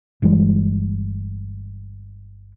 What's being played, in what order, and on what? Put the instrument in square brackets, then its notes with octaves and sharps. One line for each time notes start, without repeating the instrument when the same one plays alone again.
[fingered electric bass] G1 E3 G3 G#3